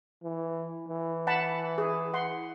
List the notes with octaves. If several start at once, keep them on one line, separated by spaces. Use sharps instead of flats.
E3
E3
F#5 A5 B5
G#4
F#5 C6